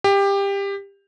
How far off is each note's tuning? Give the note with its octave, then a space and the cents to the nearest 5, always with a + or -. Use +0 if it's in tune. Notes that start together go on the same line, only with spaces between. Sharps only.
G4 +20